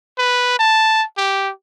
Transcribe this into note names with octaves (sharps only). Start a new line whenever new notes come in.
B4
A5
G4